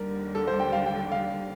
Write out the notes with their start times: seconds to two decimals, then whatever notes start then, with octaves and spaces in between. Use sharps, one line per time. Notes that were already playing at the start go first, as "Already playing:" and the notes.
Already playing: D#2 D3 G3 A#4
0.35 A4
0.47 C5
0.60 G5
0.72 F5
0.86 G5
1.12 F5